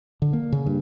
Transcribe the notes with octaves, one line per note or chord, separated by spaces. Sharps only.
D3
A#3
C#3
G2